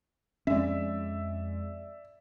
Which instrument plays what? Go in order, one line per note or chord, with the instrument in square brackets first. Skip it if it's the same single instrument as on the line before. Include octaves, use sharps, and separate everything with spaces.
[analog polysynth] F2 G#3 [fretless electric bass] C#4 [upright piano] D5 E5